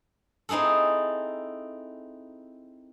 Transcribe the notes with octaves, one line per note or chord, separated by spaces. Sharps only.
C4 D#4 E4 G#4 A4